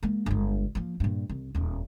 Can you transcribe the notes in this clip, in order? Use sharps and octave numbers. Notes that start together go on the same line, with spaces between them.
G#3 A#3
G1 G#3
F3 A#3
G2 A#2
C2
D#1 E2